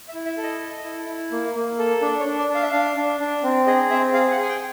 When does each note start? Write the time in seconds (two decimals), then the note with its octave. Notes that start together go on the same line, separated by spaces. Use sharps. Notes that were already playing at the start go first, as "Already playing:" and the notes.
0.08 E5
0.14 E4
0.26 E5
0.37 A4
0.43 D#5
0.61 A4
0.84 E4
1.08 E4
1.32 A#3
1.55 A#3
1.79 A4
2.02 D4 D5
2.20 C#5
2.25 D4
2.38 D5
2.49 D4
2.55 F5
2.63 E5
2.71 D4 F5
2.96 D4
3.20 D4
3.43 C4
3.67 G#4 D#5
3.90 C4 E5
4.13 G#4 F5
4.31 F#5
4.37 G#4
4.43 G#5
4.49 G5